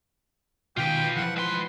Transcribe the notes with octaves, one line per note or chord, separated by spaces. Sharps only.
B2 D#3 F4 B4 G5
E3 F3 F#5
G#2 B4 C6